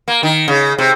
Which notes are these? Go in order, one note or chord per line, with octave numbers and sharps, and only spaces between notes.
A#3
D#3
C#3
C3